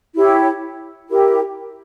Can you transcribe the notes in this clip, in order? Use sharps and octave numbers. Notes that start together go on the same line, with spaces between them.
E4 G4 C#5
E4 G4 A#4